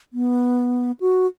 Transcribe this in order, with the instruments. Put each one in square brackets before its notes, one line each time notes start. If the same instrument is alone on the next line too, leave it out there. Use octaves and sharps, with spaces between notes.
[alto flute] B3
F#4